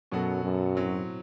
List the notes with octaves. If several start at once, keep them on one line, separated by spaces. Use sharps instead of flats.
F#2 B2 F#3 B3 F#4 A4
F#2
A2 F#3 C4